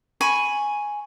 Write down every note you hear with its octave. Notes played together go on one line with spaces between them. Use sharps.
G#5 B5 C#6